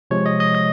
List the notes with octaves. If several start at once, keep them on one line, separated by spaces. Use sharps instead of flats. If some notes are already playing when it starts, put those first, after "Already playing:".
C3 F3 G#3 C#5
D#5
D#5
D#5